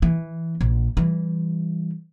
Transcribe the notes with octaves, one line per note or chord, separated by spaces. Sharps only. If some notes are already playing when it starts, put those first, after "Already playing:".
E3
A#1
E3 G3